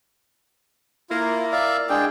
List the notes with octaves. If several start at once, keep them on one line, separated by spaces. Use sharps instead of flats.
A#3 E4 F4
D5 E5 F5
G#3 D4 G#4 G5